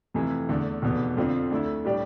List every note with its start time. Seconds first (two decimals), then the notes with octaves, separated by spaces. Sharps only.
0.14 F2 C3 E3 A3 E4
0.49 E2 D3 A3
0.82 F1 E2 B2 B3
1.17 F2 D3 F3 C4
1.51 D2 D3 A3 E4
1.84 A2 G3 D4 G4 D5